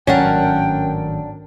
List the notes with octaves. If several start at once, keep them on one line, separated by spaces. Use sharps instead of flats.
G#1 A2 F#3 C#4 D4 A#4 F#5 G5